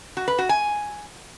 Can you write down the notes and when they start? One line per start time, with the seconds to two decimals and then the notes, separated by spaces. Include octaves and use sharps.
0.17 F#4
0.28 B4
0.38 F#4
0.49 G#5